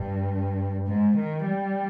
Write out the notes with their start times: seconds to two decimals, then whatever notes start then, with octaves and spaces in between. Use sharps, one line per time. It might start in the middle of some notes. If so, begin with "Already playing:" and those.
Already playing: G2
0.87 G#2
1.17 D#3
1.46 G3